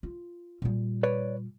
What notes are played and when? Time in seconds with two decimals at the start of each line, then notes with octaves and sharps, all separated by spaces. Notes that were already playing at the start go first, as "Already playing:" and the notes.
0.03 F4
0.62 A#2 G3
1.03 B4 C#5 D5